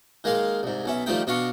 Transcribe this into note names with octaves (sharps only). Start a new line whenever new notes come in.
D#3 G#3 A#3 F5 C6
C2 G#2
B1 C#4 E5
D#3 F3 G3 A3 D#4 G5
B2 D4 D#5 F5 C#6